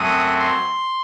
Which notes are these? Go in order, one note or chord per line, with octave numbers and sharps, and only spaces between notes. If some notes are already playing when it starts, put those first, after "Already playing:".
Already playing: F#2 F#3 A3 C4 D#6
C6